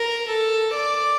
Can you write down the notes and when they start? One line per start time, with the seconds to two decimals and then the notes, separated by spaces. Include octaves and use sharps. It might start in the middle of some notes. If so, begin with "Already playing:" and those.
Already playing: A#4
0.29 A4
0.75 D5